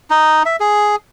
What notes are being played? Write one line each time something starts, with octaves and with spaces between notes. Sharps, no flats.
D#4
E5
G#4